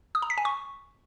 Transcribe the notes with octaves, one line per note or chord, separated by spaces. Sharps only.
D#6
A#5
B6
G#5
C#6